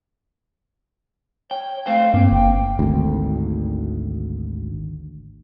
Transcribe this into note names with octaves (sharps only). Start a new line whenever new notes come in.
C#5 G5
A3 C5 F5 G5
G2 A#3 C4
G1 G5
G#1 D2